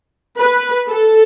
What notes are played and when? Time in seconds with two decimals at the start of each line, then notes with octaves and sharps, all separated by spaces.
0.39 B4
0.89 A4